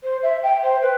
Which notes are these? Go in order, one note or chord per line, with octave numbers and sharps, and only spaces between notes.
C5
E5
G5
C5
B4